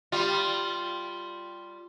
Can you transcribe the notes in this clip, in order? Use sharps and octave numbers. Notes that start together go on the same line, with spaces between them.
G3 F4